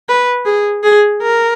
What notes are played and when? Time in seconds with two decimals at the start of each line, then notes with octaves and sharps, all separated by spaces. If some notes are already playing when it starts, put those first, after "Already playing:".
0.09 B4
0.46 G#4
0.84 G#4
1.22 A#4